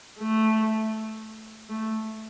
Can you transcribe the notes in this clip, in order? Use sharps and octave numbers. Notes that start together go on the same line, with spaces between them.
A3
A3